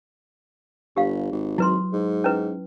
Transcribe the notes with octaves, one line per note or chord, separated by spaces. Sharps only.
G1 G4 F5
G#1
F#3 E4 B4 C6
G#2
C#4 E4 B4